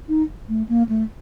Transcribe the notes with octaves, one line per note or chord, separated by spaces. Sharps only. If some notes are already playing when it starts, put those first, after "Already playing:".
D#4
A3
A#3
A3